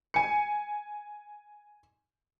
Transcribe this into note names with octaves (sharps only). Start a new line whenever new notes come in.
G#5 C#7